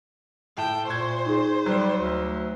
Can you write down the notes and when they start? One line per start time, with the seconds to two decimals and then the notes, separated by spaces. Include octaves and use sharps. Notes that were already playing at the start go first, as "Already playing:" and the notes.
0.58 A2 G5 A5 E7
0.87 A#2 C5 C#6 G#6
1.26 D#4 G#4
1.66 F#3 G3
1.98 D2